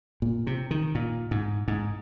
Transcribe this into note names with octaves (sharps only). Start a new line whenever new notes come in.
A#2
C3
D#3
A#2
G#2
G#2